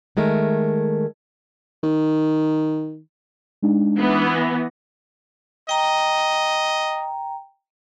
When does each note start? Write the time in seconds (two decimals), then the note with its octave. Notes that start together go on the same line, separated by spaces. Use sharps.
0.17 D#3 G#3 A3 A#4
1.83 D#3
3.62 G#3 D4 D#4
3.98 E3 B3
4.35 A#6
5.69 D#5 G5 A#5